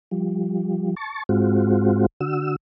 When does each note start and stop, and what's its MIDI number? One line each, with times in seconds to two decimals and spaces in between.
0.11 0.95 53
0.11 0.95 55
0.96 1.23 81
0.96 1.23 85
1.29 2.06 44
1.29 2.06 56
1.29 2.06 60
1.29 2.06 65
1.29 2.06 66
2.21 2.56 50
2.21 2.56 66
2.21 2.56 88